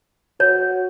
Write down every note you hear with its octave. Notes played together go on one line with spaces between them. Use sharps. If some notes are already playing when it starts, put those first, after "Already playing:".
F#4 C#5